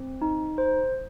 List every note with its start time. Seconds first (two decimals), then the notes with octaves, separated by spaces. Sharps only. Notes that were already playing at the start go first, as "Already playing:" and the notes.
Already playing: C4
0.22 D#4
0.58 C5